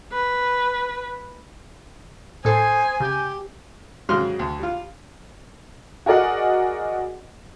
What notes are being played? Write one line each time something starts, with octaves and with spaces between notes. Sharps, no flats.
B4
A2 A4 C5 G#5 D#6 G#6 C7
C#3 G4 G6
G#2 C#3 F#3 G3 C6 F6
D2
G3 F4
F#4 G#4 A#4 D5 D#5 F#5